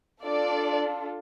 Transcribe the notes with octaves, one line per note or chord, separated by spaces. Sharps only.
D4 F4 A4 D5